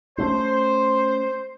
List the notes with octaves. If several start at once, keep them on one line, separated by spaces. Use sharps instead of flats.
A3 C#4 C5